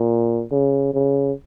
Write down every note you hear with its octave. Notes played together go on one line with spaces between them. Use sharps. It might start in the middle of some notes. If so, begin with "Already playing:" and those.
Already playing: A#2
C#3
C#3